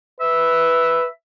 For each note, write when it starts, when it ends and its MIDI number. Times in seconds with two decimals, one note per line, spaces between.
0.21 1.08 71
0.21 1.08 76